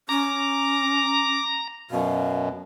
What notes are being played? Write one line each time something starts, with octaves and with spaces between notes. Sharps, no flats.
C#4 A#5 D6
F#2 B2 F5